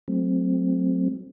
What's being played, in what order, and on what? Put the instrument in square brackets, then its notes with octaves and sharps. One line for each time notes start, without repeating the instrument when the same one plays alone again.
[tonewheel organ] F#3 A3 C4